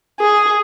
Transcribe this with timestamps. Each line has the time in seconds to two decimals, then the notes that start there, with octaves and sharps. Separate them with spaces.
0.20 G#4